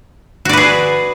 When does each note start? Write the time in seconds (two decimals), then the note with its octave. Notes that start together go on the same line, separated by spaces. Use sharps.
0.45 F#4
0.49 D5
0.53 B4
0.57 G#4